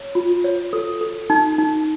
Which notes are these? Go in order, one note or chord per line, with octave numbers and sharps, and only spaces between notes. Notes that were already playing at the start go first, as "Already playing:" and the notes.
Already playing: C#5
F4
C#5
A4
A4
D#4
D#4